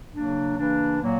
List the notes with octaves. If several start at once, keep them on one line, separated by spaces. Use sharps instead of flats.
C#3 F#3 A#3 D4
C#3 E3 A#3 D4
A#2 F#3 A#3